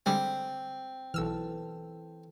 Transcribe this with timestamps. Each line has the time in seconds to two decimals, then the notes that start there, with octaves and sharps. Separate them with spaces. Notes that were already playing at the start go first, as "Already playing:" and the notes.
0.06 D3 G3 G#3 C4
1.14 B1 E3 A4 E6 F6